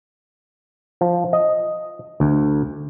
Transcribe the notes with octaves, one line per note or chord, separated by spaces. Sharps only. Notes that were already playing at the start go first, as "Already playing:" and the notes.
F3
D#5
D2